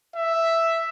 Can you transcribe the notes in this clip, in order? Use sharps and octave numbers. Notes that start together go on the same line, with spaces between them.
E5